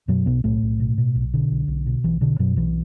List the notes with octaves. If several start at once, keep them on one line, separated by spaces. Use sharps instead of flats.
F#2 B2 F#3
B1 B2 B3
B1 A2 A3
B1
B2
B2
B1
B2 D3
B1
B1
B2
B1 E3
B2 D3
F#2 B2 F#3
B1 E3